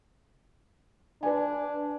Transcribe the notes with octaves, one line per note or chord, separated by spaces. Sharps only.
D4 B4 G#5